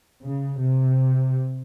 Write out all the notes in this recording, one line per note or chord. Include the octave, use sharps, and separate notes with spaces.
C#3
C3